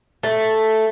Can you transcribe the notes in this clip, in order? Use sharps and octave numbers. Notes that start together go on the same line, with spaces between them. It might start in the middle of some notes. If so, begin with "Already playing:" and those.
A3